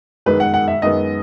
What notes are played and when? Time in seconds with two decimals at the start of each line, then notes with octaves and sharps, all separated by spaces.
0.26 F#2 D#3 G#3 B3 B4
0.40 F#5
0.54 F#5
0.68 E5
0.82 F#2 D#3 G#3 B3 D#5